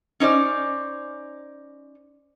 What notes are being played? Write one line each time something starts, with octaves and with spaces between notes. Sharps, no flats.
C#4 D#4 C5 D5